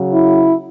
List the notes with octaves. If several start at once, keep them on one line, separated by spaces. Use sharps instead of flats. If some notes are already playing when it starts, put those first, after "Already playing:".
Already playing: C#3 F#3
E4